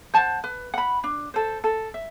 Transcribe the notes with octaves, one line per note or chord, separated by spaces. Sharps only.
C5 F#5 A5
B4
F#5 B5
D4
A4 C5
A4
E5